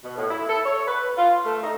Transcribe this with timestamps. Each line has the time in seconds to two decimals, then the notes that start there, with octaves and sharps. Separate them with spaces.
0.03 B2
0.17 A2
0.31 E4
0.49 A4
0.66 C#5
0.88 B4
1.18 F4
1.45 A3
1.64 D#4